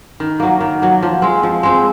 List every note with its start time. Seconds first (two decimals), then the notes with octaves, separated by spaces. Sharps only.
0.20 D#3
0.40 F#3 A#3
0.60 D#3
0.82 F#3 A#3
1.02 F3
1.22 G#3 C4
1.43 F3
1.63 G#3 C4